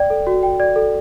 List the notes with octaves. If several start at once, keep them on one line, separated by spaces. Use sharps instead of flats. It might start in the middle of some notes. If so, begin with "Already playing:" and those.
Already playing: D5 G5
A4
F#4
G5
D5
A4